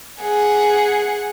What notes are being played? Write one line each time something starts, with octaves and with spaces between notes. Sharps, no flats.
G#4 F#5